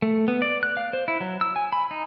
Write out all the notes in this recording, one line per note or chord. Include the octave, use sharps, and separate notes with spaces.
A3
B3
D5
F#6
F5
C5
E4
F#3
E6
G#5
B5
D#4